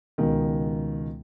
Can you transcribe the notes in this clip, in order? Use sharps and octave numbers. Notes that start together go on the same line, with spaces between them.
C#2 B2 D#3